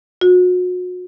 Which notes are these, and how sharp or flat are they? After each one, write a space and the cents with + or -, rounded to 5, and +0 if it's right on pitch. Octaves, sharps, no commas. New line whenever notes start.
F#4 -35